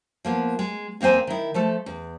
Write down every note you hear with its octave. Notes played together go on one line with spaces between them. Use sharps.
F3 A#3 B3
G#3
E2 A#3 C4 C5 G#5
D#3 E4
F3 A3 A4
E2